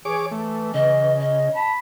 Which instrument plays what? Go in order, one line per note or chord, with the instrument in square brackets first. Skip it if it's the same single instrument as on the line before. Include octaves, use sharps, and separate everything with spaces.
[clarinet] E3 [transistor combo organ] G#4 C#5 D6
[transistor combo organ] A3
[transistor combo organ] C#3 [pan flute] D#5
[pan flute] D#5
[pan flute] A5 [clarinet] B5